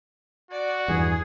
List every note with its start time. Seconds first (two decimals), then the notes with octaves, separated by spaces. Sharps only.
0.51 F#4 D5
0.88 E2 G2 E3 G#4